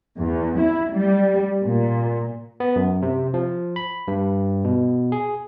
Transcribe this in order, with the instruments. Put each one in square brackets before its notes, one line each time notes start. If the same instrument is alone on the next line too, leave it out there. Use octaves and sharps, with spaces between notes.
[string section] E2
E4
G3
A#2
[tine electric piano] B3
F#2
C3
F3
B5
G2
B2
G#4